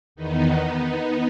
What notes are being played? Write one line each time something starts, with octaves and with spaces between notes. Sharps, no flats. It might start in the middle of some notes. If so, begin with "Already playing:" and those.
E2 D#3 B3 D#4